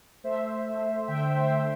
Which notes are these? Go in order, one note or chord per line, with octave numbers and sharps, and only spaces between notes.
A3 C5 E5
A3
D3 E5 G5
C5 E5
A3